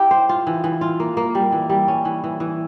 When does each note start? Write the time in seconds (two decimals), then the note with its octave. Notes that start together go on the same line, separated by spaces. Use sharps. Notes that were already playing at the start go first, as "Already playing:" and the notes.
Already playing: E4 G4
0.11 C5
0.29 F4
0.47 E3
0.64 E3
0.81 F4
1.00 A#3
1.17 A#3
1.35 G3
1.52 E3
1.70 G3
1.88 C#4
2.05 E3
2.24 E3
2.40 E3